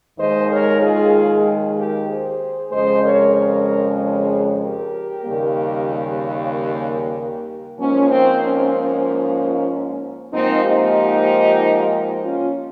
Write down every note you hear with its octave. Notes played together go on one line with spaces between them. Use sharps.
D#2 D#3 G#3 C5 D#5
A#4 C#5
F4 G#4
G4 A#4
G#4 C5
F2 C#3 G#3 C5 D#5
A#4 C#5
A#4 C#5
A#4 C#5
G4 A#4
D#2 C#3 G3 A#3
G4 A#4
G#2 F3 A#3 C#4
C4
C#4
C#4
G#2 F3 A#3 C4 D#4
D#4 G4
C#4 F4